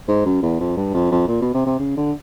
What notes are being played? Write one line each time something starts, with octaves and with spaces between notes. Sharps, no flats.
G#2
F#2
E2
F2
G2
F2
F2
A#2
B2
C3
C3
C#3
D3